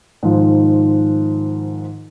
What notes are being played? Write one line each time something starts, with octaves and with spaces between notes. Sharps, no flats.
G#2 D#3 F3